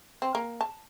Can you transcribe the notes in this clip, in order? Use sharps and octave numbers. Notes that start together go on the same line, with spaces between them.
C4
A#3
A5